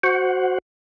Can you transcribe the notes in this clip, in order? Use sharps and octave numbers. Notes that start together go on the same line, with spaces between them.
F#4 C5 F#5